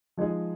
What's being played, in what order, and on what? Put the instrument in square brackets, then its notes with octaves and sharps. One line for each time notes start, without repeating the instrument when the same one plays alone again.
[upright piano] F3 G#3 D#4 G#4